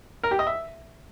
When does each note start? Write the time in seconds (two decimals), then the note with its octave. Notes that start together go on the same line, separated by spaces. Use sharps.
0.23 A#4
0.31 G4
0.39 D#5
0.47 E5